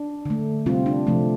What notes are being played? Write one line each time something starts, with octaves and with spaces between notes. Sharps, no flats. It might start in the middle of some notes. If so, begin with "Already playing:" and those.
Already playing: D4
D3 A3
C3 G3 C4 F4
D4
C3 F3 A3 C4